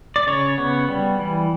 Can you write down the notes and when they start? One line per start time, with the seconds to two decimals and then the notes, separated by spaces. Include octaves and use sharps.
0.16 D5
0.27 C#3 C#5
0.58 B3
0.89 G3
1.19 E3